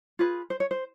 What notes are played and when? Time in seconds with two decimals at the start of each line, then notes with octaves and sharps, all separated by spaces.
0.19 F4 G#4 B4
0.50 C5
0.60 C#5
0.71 C5